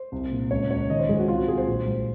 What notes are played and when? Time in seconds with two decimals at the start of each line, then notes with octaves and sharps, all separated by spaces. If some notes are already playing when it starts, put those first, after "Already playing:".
Already playing: C5
0.12 C2
0.32 A#2
0.51 C#2 C#5
0.70 C#2 C#5
0.90 D#3 D#5
0.99 C5
1.09 G#2 G#4
1.19 F#4
1.28 C2 F4
1.38 F#4
1.48 C2 G#4
1.58 C5
1.68 A#1
1.87 G#2